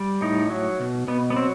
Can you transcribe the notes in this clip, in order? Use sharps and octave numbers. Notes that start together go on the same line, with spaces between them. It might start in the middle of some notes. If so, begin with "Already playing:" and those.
Already playing: G3
A2 D#4
F#3
B2
B2 B3
B3
F#3 C4